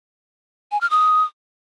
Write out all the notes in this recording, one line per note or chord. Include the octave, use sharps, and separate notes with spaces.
G#5
F6
D#6